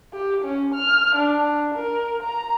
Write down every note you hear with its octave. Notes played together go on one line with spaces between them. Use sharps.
G4
C#4
F6
D4
A#4
A#5